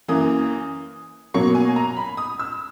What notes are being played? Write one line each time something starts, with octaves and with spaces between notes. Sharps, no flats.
F#2 E3 A#3 D#6
B2 F#3 A#3 C#6
G#5
A#5
B5
D#6
E6